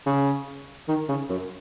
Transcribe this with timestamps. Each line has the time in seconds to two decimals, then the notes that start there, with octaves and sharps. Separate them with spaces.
0.06 C#3
0.88 D#3
1.08 C#3
1.29 F#2